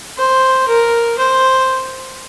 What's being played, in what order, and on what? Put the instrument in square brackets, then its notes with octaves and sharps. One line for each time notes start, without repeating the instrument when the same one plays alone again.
[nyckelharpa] C5
A#4
C5